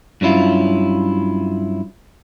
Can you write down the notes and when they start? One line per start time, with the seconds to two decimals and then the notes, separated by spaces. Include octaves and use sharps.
0.21 G2 F#3 C#4 E4 F4